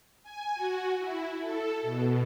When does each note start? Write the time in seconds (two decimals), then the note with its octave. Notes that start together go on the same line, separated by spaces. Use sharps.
0.23 G#5
0.55 F#4
0.99 E4
1.40 A4
1.82 B2